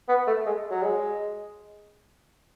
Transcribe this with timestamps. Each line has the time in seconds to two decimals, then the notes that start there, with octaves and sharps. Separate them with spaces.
0.09 B3
0.27 A3
0.46 G#3
0.71 F#3
0.83 G#3